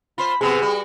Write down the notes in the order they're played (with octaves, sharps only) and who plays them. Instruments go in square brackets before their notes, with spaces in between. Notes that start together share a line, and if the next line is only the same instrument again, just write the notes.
[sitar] F4 C5 [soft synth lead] B5
[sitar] C3 F3 B3 [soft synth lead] G#4
[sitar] G3 F#4